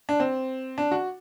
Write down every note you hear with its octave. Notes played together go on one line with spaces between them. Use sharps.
D4
C4
D4
F#4